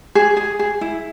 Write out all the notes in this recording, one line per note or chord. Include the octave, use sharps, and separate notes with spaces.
G#4
G#4
G#4
E4